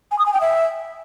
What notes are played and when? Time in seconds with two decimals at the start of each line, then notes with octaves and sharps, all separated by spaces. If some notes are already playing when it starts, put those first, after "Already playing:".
0.11 G#5
0.19 D#6
0.26 G#5
0.33 G5
0.41 E5